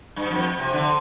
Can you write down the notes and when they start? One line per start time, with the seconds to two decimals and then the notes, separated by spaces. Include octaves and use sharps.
0.16 G2
0.31 F2
0.58 C3
0.73 D3